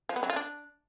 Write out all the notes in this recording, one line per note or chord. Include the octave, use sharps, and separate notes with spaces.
F3
B3
F#3
F4
D4